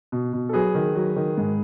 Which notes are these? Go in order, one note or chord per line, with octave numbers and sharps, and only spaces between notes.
B2
B2
A4
F#3 G#4 B4
D#3
F#3
D#3
G#2